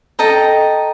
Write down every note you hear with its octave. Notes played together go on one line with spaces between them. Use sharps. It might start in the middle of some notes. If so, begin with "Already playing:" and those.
A4 D#5 G5 A#5